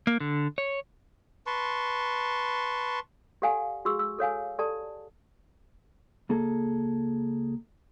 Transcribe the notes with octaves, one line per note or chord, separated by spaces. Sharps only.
A#3
D3
C#5
B4 A5 C6 C#6
G4 A4 D5 F5 F#5 G#5
F#4 G#4 C#6 E6
E6
A4 C#5 F5 G#5
G4 A4 D5 A5
C#2 A#3 G#4 A4